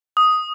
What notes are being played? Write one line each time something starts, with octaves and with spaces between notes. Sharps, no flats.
D#6